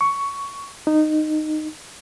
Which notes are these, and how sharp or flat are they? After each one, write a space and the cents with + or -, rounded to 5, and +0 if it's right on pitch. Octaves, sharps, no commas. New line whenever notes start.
C#6 +10
D#4 -15